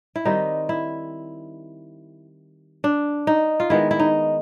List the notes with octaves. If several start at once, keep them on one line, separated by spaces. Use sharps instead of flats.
E4
D#3 G3 C4 D#4
E4
D4
D#4
F4
D#3 G#3 B3 E4
E4
D#4